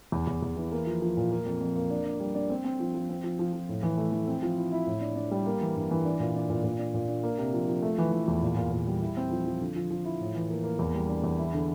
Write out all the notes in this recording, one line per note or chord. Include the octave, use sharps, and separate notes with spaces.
E2
E2
E2
E3
A#3
F3
F3
A#2
A#3
F2
F2
A#3
D4
D4
G3
D4
C4
C4
F3
F3
C4
F3
F3
F3
A2
E3
A3
E3
C4
F3
E4
E4
A2
D4
D4
G3
A#3
E3
G2
E3
D4
A#2
D4
A#2
A#2
D4
A#2
D4
A#3
C3
F3
F3
A3
E3
E3
E2
A#2
A#2
A#2
G3
E4
C4
F3
F3
D3
F3
F3
E4
A2
E3
A#3
A#3
E2
G3
D4
E2
E4
D3